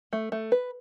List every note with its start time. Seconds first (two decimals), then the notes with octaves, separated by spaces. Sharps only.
0.13 A3
0.32 A3
0.52 B4